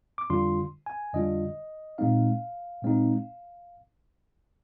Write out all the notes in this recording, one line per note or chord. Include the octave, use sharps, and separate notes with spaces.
D6
F2 D3 G3 D4 F4 C6
G#5
F2 D3 G3 D4 F4 D#5
A#2 G#3 C4 D#4 F5
A#2 G#3 C4 D#4